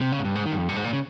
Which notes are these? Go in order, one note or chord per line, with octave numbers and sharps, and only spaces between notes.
C3
C#3
G#2
G2
G#2
D#3
G2
F2
G2
G#2
A#2
C#3